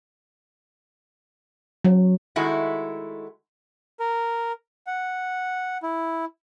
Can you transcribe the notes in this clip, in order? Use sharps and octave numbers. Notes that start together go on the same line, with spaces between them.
F#3
D#3 G#3 A3 E4 F#4
A#4
F#5
E4